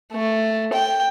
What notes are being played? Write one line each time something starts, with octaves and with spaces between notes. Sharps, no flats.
A3
G5